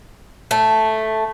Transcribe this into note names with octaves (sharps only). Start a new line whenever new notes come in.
A3